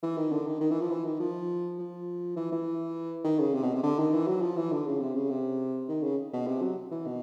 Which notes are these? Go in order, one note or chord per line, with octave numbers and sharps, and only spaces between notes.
E3
D#3
D3
D#3
D#3
E3
F3
E3
D#3
F3
F3
E3
E3
D#3
C#3
C3
B2
C3
D3
D#3
E3
F#3
F3
E3
D3
C#3
C3
C#3
C3
D#3
C#3
B2
C3
F#3
E3
B2